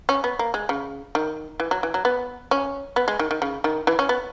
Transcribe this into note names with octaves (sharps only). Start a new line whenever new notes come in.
C#4
B3
A#3
G#3
C#3
D#3
E3
F#3
E3
F#3
B3
C#4
B3
G#3
D#3
D#3
C#3
D#3
E3
C#4
B3